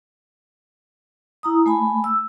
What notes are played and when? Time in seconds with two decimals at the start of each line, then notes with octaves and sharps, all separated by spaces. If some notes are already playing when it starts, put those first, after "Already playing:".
1.43 E4 A#5 D#6
1.66 A3 G#5 B5
2.04 E6